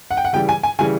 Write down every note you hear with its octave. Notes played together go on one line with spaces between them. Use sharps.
F#5
G5
F#5
C#3 E3 G3 G5
G#5
G#5
C#3 E3 G3 G#5